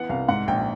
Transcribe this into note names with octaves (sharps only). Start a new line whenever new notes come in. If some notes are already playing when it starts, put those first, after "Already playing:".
Already playing: E3 B3 F#5
C2 F5
G#2 F#5
A#1 G5